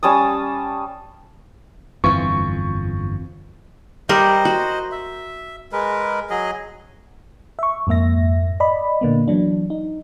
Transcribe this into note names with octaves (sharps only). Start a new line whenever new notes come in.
G3 C#4 A5 D#6
G1 F2 E3 C4 F4 C#6
G3 G4 A#4 C5 D#5
F#4
E5
G#3 A#4 B4
F#3 G#4 D#5
E5 C#6
F2 G#2 A#3 E5 A#6
D5 D#5 B5
A#2 D3 A#3 B3
E3 F#3 D4
D#4